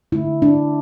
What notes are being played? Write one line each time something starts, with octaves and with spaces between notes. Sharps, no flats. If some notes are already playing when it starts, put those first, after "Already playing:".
D3 A3 E4
D4